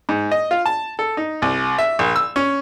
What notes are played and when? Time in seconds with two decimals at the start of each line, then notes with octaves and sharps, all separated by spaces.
0.09 G#2
0.32 D#5
0.51 F4
0.66 A5
0.99 A4
1.17 D#4
1.42 C2
1.78 E5
1.99 A#1
2.16 E6
2.36 C#4